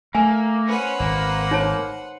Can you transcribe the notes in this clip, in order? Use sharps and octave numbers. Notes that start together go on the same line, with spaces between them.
A3 A#3 G#5
C#4 B4 C5 F#5
G#1 A#3
D#4 C#5 A5